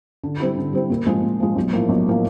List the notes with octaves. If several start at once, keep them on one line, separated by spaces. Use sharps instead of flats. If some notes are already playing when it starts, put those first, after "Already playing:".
D3
G3 C4 E4
D3
G3 C4 E4
A#2
F3 G#3
A#2
F3 G#3
B1
A2 F3 A#3
B1
A2 F3 A#3